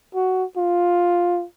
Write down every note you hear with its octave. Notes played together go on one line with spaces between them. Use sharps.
F#4
F4